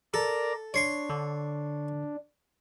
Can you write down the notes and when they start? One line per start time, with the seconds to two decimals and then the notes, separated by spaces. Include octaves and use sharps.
0.14 A4 A#4 D5 A#5
0.74 D4 C#5 C6 C#6
1.10 D3